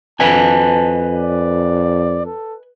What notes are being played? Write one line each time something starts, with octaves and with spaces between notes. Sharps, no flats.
F2 B4 D#5 G#5 A5
D5
A4